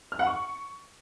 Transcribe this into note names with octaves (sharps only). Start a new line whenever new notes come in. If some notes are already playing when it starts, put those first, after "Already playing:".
F6
F#5
C#6